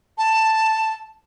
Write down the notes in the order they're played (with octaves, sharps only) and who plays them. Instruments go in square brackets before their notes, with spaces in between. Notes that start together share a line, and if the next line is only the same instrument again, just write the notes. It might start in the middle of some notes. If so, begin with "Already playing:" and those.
[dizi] A5